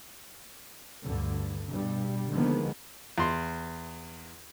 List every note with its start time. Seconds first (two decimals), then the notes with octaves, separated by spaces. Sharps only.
1.02 D2 G2 D3
1.70 G2 B2 G3
2.31 D3 D#3 F3 G#3 A#3 B3
3.18 E2 C6